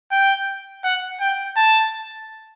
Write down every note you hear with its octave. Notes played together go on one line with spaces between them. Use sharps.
G5
F#5
G5
A5